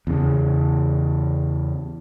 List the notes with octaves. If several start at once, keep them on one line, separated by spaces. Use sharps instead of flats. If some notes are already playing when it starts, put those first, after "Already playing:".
E2 C#3